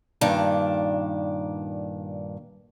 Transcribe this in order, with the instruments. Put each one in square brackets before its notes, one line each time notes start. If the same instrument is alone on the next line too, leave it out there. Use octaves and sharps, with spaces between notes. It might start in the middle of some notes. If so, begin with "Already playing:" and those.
[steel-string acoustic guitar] G2 A#2 D#3 D4